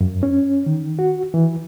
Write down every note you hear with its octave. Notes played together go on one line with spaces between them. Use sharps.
F#2
C#4
D#3
F#4
E3